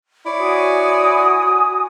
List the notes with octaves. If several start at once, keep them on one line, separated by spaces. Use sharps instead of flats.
E4 C#5 D5
F#4 G#5 D#6